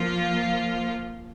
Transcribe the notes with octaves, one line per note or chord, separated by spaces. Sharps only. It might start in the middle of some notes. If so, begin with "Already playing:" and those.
Already playing: F3 A#3 F4